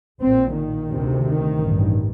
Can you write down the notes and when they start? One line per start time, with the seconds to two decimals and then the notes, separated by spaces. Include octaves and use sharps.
0.21 A#1 A#2 C4
0.54 D#3
0.89 D2 C3
1.23 D#3
1.57 A1 G2